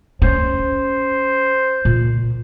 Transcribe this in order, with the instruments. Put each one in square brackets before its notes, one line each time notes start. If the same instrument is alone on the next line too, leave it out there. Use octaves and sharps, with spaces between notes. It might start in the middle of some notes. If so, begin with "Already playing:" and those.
[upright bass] C#4 [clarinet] C5
[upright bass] A#2